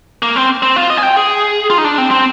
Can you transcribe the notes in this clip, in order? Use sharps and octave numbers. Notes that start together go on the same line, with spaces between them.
A#3
C4
C4
F4
D#5
G#5
G5
G#4
F4
D#4
D4
C4
C4